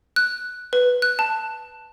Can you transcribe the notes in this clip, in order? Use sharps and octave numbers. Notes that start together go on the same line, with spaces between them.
F#6
B4
F#6
A5